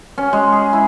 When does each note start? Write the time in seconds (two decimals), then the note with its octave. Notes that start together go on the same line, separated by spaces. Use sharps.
0.18 C#4
0.33 G#3
0.52 G#4
0.73 E4